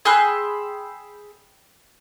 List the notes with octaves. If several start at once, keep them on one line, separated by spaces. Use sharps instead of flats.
G#4 G5 B5 C6 E6 F#6